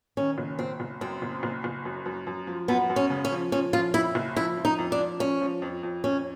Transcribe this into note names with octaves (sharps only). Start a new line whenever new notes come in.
D#3 C#4
F#1
F#1 C4
F#1
F#2 C4
F#1
F#1
F#1
F#2
F#2
F#2
F3
F#2 B3
F#2
C#4
C#3
C#4
F3
F3 C#4
F3 F4
F2 E4
F#1
F3 E4
F3
D#4
F2
D4
F3
F3 C#4
F3
F2
F2
F2 C#4